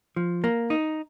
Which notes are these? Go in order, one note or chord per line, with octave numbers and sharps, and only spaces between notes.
F3
A#3
D#4